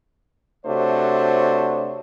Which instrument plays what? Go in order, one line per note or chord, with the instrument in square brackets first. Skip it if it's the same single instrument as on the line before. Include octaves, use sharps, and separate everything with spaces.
[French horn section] C3 A3 D4 F#4 C5 C#5